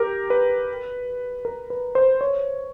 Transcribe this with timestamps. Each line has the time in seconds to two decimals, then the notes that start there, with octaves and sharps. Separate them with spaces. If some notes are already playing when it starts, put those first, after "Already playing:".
Already playing: G4 A#4
0.30 B4
1.45 A#4
1.70 B4
1.95 C5
2.21 C#5